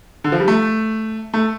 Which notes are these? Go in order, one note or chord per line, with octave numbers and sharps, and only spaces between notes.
D3
F3
G3
A3
A3